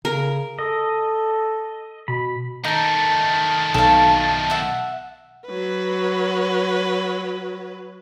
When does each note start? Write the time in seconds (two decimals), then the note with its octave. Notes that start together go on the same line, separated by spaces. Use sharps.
0.05 C#3 A#4
0.59 A4 D#5
2.08 B2 B5
2.64 D#3 A3 D#4 A#4 A5
3.74 B1 A4 F5
4.50 E5 F#5
5.47 F#3 B4